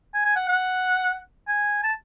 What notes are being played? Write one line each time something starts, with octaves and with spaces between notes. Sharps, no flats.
G#5
G#5
F#5
F#5
G#5
A5